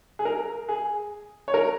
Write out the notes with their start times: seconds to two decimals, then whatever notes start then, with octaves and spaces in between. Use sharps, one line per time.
0.19 G#4
0.25 A#4
0.69 G#4
1.48 C#5
1.54 A#4